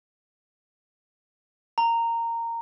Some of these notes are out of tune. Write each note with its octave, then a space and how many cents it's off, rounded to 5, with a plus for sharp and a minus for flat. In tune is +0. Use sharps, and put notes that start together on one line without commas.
A#5 -15